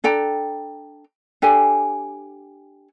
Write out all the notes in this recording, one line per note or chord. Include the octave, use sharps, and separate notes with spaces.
D4 A4 G5 A#5
D4 G4 A4 G#5